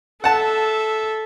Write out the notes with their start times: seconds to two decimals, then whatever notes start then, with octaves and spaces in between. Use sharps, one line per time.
0.24 A4 E5 F#5 A5